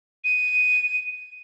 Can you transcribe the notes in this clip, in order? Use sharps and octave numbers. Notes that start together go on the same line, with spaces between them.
D#7